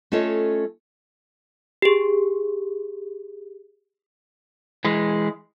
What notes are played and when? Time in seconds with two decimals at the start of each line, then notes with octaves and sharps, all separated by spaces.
0.12 A3 C#4 F4 A4 C#5 D#5
1.82 G4 G#4
4.85 E3 G#3